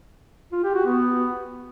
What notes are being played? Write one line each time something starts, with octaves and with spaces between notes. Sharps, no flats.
F4
G4
F#4
B3